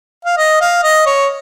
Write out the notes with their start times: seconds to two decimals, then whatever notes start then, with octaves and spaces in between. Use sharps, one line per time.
0.25 F5
0.38 D#5
0.61 F5
0.83 D#5
1.06 C#5